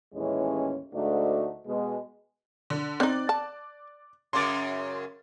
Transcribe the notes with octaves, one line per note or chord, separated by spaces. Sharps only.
D#2 A2 E3 G#3 C#4
D2 G#2 A3 D4 D#4 F#4
B2 G#3
D3
C4 D#4 D5 F#6
A5
F#2 C#3 C6 D6 A6